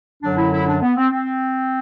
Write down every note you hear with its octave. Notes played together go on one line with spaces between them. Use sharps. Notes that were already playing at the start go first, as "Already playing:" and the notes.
F#2 D3 F#3 D4
E4
E4
D4
B3
C4
C4